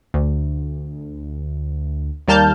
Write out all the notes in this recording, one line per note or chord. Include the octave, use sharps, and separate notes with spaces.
D2
D#2 G3 A#3 A5 F6 G6